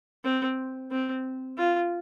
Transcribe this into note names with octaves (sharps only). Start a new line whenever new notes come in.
C4
C4
F4